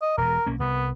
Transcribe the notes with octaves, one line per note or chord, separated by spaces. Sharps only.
D#5
E1 B2 A#4
B1 A#3 C#4
C2 B3